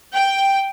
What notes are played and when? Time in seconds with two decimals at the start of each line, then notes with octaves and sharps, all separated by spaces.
0.12 G5